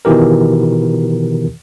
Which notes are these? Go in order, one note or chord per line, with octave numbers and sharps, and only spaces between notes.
B2 D#3 E3 G4 A#4